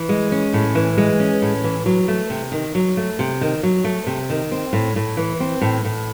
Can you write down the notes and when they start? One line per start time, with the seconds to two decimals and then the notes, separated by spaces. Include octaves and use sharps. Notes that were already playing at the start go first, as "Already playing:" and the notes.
Already playing: E3
0.09 G#3
0.32 C#4
0.53 A2
0.75 E3
0.97 G#3
1.20 C#4
1.42 A2
1.64 E3
1.86 F#3
2.08 A3
2.30 C3
2.52 D#3
2.75 F#3
2.97 A3
3.19 C3
3.41 D#3
3.63 F#3
3.84 A3
4.07 C3
4.30 D#3
4.51 C4
4.73 A2
4.96 A2
5.17 E3
5.40 C4
5.61 A2
5.84 A2